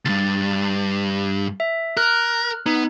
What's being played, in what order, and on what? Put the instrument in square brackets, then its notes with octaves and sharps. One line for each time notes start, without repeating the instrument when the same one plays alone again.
[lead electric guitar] D2 G2 [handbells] A6
[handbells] E5
[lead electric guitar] A#4 [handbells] F6 F#6
[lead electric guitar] B3 [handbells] D#4